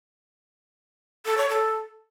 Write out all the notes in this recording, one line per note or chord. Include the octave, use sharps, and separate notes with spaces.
A4
C#5
A4